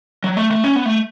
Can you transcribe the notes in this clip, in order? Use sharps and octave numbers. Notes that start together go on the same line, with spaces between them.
F#3
A3
A3
C#4
B3
A3